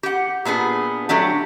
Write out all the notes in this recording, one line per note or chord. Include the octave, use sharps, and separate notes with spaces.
G4 F#5
A#2 B3 D4 G#4
F#3 A3 D4 G4